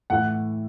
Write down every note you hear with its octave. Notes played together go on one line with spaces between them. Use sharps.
A2 E3 A3 F#5